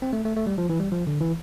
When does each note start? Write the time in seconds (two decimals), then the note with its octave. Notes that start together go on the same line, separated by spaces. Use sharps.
0.02 C4
0.13 A3
0.25 A3
0.36 A3
0.47 G3
0.58 F3
0.70 E3
0.80 G3
0.92 F3
1.07 D3
1.21 E3